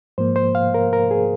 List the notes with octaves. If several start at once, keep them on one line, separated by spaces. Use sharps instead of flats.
G#2 F3 A#3 C5
C5
F5
A#4
A#4
G#4